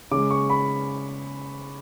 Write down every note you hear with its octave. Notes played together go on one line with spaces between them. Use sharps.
C#3 G#3 D6
C#6
B5